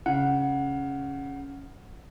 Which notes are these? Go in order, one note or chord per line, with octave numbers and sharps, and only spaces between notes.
C#3 F#5